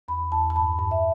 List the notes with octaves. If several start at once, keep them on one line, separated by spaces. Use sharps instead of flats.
E2 B5
E2 A5
A5
G2 B5
G2 A5
E5